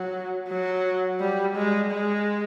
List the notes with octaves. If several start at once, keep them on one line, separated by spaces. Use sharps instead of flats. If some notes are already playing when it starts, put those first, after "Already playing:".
Already playing: F#3
F#3
G3
G#3
G#3